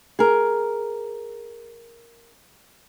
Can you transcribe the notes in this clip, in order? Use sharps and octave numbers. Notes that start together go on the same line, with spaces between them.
G#4 A#4